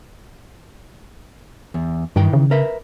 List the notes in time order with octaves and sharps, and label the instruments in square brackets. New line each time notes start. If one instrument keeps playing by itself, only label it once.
[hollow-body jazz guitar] E2
[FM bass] G2 [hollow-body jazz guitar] D#3 E3 G5
[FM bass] C#3
[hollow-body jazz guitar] A#4 B4 E5